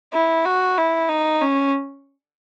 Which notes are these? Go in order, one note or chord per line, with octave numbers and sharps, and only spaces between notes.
E4
F#4
E4
D#4
C#4